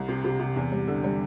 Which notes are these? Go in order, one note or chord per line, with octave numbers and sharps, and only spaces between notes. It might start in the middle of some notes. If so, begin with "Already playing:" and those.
Already playing: C2
C3
C3
C3
E2
G3
D3
G3